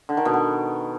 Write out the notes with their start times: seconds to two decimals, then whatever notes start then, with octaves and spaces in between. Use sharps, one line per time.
0.09 D3
0.17 D#3
0.25 B2
0.34 B3